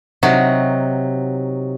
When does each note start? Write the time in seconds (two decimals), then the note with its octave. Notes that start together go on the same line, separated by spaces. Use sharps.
0.23 C3 F#3 D#4 F#4